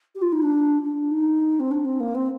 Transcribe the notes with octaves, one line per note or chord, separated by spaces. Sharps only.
G4
F4
D#4
D4
D4
D#4
C4
D4
C4
A#3
C4